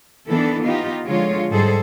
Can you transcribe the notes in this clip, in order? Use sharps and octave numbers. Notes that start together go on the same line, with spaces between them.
D#3 E3 B3 D4 E4 A4
B3 D#4 F4 G4
D3 F3 G#3 F4 C#5
G#2 G3 G#4 A4 C5